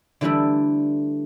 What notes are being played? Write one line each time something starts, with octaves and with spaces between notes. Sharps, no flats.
D3 E3 G3 A3 D4 E4